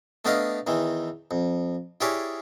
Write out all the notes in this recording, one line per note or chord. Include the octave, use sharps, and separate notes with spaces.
A3 B3 D4 A#4 D#5 F5
E2 D#3 E3
F2
E4 G4 G#4 A#4 C#5 D5